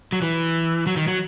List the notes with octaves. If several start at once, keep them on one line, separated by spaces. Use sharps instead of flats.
F#3
E3
F#3
D#3
F#3